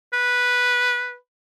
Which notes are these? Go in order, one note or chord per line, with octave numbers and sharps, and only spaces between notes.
B4